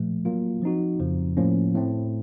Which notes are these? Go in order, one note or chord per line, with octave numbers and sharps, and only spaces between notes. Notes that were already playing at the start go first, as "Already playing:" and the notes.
Already playing: A#2 F3 A3
F#3 A#3 F4
F3 C4 D#4 F#4
F2 C#3 F3
A2 F3 A#3 C#4
A2 A3 C4